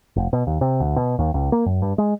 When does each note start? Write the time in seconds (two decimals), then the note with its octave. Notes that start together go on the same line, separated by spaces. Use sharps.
0.16 F1
0.33 B2
0.47 D#2
0.61 C3
0.80 D2
0.96 B2
1.19 D#2
1.34 C#2
1.52 A#3
1.66 F#2
1.82 G2
1.98 G#3